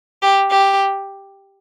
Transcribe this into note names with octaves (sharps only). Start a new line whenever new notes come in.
G4
G4